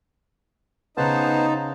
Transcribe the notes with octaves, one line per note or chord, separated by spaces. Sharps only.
C#3 B3 D#4 C5 A5 F#6